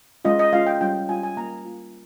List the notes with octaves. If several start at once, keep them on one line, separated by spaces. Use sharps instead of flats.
G#3 C#4 F4 D#5
D#5
G#3 C#4 F4 F5
G5
G3 C#4 F4 G5
G3 C#4 F4 G#5
G#5
A#3 F4 A#5
A#3 F4